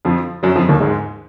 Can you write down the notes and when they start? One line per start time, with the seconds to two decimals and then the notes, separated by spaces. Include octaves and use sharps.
0.05 F2 F3
0.43 F#2 F#3
0.56 F2 F3
0.69 D#2 D#3
0.80 G#2 G#3